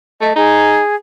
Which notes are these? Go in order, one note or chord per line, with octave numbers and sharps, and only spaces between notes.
A3 D#5
D#4 G#4